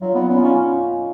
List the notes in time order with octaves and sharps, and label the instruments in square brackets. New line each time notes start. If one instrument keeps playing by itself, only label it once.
[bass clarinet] F#3 [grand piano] F4
[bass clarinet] B3 [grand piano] D#4
[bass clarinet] B3 [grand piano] C#4
[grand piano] F4
[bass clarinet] C#4 [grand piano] D#4